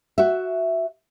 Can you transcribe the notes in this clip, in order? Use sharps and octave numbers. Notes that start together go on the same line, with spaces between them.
F#4 E5